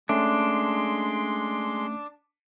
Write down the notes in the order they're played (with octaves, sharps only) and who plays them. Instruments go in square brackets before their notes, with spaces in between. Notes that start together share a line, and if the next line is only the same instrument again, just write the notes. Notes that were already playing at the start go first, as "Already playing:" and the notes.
[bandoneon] G#3 C6 [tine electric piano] A3 C#4 [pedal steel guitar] D4